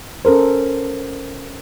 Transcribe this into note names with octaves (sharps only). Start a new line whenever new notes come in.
C#4 A4 A#4 C5